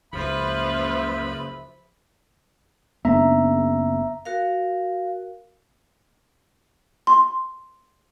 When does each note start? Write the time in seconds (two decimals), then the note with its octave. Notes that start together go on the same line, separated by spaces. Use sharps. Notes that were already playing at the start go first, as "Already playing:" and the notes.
0.13 F#1 C#2 F3 B4 E5 B5
3.05 F#1 B3 D4 E5 A#5
4.25 F#4 A#4 F5
7.07 C6